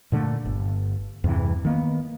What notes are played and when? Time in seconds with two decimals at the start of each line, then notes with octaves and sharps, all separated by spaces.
0.12 A#2 D3 F#3 A3
0.46 G1
1.24 E2 G2 C3 E3
1.65 D#3 A#3 B3